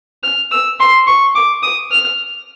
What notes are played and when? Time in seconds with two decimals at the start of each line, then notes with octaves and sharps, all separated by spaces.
0.23 F6
0.52 E6
0.80 C6
1.07 C#6
1.35 D6
1.63 D#6
1.91 F6